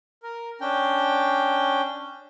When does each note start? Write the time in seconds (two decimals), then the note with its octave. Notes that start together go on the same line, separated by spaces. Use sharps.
0.23 A#4
0.61 C#4 D4 G5